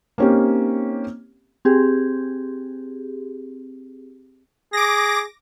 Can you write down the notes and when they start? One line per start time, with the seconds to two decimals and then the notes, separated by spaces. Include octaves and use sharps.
0.18 A#3 C4 C#4 D#4 G4
1.65 C4 G4 G#4
4.73 G#4 D6 A#6